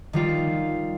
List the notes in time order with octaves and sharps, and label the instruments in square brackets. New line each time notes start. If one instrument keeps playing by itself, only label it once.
[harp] D#3 G3 F4